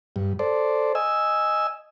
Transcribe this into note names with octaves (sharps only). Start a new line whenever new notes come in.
G2
A4 C5 D5
D#5 G#5 E6